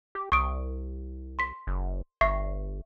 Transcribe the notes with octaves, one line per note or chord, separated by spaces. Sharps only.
G4
C2 C#6 D#6 D7
C6 B6
F#1
G1 E5 C#6 C7